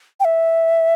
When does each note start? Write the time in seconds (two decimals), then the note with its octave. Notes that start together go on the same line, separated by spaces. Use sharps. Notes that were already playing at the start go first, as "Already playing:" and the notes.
0.20 G5
0.25 E5